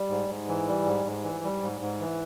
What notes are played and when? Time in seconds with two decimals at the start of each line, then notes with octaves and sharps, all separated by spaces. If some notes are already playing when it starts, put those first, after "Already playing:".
Already playing: G3
0.09 G#2
0.29 G#2
0.48 E3
0.68 G3
0.86 G#2
1.06 G#2
1.24 E3
1.44 G3
1.62 G#2
1.81 G#2
2.00 E3